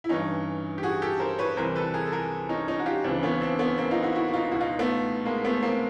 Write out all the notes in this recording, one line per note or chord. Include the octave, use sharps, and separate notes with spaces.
E4
G2 E3 C#4 D#4
G4
F#4 G#4
G4 A4
A#4 C5
B4 C#5
C2 C3 E3 A#4 C5
A4 B4
G#4 A#4
A4
G#4 A#4
C#4 D#4
C#4 D#4
F#4
F4 G4
C#2 C#3 E3 C4 D4
B3 C#4
C4 D4
B3 C#4
A#3 C4
D#4 F4
E4 F#4
E4 F#4
F#4
D#4 F4
C#2 B2 E4 F#4
D#4 F4
A3 B3
G#3 A#3
A3 B3
A#3 C4